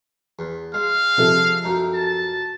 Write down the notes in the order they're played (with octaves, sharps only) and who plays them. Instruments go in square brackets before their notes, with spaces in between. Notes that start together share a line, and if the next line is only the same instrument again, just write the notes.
[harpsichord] E2
[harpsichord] G#3 [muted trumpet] F5
[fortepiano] C3 F3 A4
[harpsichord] F#2 D#4
[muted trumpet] A5